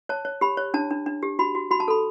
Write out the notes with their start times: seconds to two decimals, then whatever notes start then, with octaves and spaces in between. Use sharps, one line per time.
0.09 C#5 A5
0.25 C#5
0.41 G4 B5
0.57 C#5
0.74 D4 A5
0.91 D4
1.06 D4
1.22 G4
1.39 F#4 B5
1.55 F#4
1.71 F#4 B5
1.80 A5
1.88 A4 B5